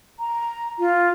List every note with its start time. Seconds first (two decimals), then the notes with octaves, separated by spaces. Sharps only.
0.19 A#5
0.79 F4